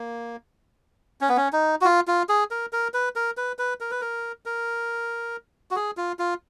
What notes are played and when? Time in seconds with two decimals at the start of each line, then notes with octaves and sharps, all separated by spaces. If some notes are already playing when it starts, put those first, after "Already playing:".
Already playing: A#3
1.21 C#4
1.29 B3
1.37 C#4
1.53 D#4
1.81 F#4
1.85 F4
2.07 F4
2.29 G#4
2.51 A#4
2.73 A#4
2.94 B4
3.16 A#4
3.37 B4
3.59 B4
3.81 A#4
3.91 B4
4.01 A#4
4.46 A#4
5.71 F#4
5.76 G#4
5.97 F4
6.19 F4